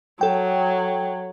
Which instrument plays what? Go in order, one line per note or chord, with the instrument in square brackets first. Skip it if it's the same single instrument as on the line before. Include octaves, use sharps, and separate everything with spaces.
[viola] F#3 [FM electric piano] A4 G5